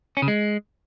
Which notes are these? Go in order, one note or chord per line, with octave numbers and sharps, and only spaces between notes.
C#4
C#3
G#3